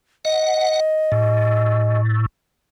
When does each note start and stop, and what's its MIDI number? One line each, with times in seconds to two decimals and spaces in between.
0.25 2.00 75
0.25 0.80 78
1.12 2.26 45